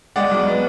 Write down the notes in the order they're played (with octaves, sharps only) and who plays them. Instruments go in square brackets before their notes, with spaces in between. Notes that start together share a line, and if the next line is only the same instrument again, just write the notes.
[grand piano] G#3 D5 F#5
B1
B3